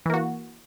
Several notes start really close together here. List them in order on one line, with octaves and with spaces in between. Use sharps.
E3 A#3 F#4